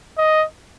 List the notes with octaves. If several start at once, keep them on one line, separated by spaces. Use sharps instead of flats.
D#5